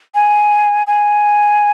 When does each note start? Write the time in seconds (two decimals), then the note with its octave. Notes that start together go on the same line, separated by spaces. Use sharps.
0.15 G#5
0.87 G#5